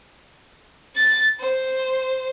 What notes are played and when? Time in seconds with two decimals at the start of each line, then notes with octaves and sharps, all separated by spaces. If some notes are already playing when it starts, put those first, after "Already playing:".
0.95 A6
1.40 C5